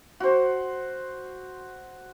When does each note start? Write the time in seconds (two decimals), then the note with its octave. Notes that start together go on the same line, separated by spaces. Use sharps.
0.20 F#4 C5